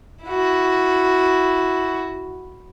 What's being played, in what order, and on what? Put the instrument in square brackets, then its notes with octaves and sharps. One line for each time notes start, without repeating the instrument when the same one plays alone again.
[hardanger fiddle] E4 F#4